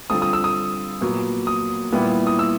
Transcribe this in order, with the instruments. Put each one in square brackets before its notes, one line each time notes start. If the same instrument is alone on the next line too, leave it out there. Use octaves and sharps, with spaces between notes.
[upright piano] D3 G3 C4 F4 A4 [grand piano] D#6
[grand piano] D#6
E6
D#6
[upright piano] A#2 F#3 B3
[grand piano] D#6
[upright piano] A#2 G3 B3 E4
[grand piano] D#6
E6